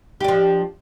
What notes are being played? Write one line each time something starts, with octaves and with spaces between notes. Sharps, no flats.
F3 D4 G4